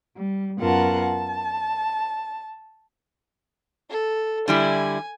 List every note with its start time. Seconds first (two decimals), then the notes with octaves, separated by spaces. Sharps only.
0.18 G3
0.60 F#2 B3 F4 A#4 F#5 A5
1.01 A5
3.90 A4
4.48 D3 G3 E4 G#5